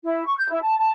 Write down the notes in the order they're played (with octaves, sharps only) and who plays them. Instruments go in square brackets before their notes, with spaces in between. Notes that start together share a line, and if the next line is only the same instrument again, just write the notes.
[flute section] E4
C#6
G6
E4
A5
A5